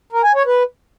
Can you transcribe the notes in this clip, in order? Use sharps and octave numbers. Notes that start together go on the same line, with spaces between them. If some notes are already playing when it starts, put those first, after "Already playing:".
A#4
G#5
C#5
B4